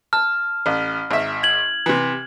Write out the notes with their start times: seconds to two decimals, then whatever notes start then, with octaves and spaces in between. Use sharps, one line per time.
0.13 A5 F6
0.66 A1
1.11 G#1 E5
1.43 G#6 F#7
1.86 C3 E3